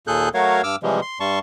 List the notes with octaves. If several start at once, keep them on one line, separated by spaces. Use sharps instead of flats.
D#2 A#2 G#4 A4 F#6 G6
F#3 A3 F#4 A#4 C#5 F5
G2 D6 E6 F6
C3 E3 F3 G3 G#3
C6
G2 G3 A5 C6 C#6